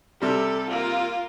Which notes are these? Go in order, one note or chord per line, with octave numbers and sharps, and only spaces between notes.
C3 G3 A4
A#3 F4